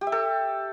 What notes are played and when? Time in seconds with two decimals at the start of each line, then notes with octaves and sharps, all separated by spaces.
0.01 G4
0.07 E5
0.12 A4